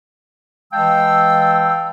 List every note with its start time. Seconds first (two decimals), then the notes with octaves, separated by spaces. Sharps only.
0.73 E3 G#3 F5 G5 A5 E6